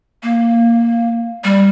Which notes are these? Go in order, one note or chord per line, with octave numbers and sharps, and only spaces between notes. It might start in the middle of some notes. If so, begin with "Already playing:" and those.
A#3
G3